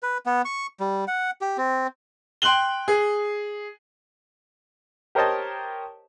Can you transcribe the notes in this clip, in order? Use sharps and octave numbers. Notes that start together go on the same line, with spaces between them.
B4
B3
C#6
G3
F#5
G4
C4
G5 C6 F#6 F#7 G7
G#4
G4 A#4 C5 C#5 D#5 A5